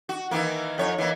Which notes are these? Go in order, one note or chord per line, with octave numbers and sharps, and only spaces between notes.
F#4
D#3 E3 A#3
F2 C#5
E3 A#3